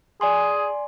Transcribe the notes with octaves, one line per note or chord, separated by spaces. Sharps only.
G#4 D5 G#5 C6